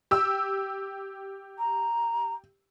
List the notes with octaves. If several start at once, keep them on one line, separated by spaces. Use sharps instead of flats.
G4 E6
A#5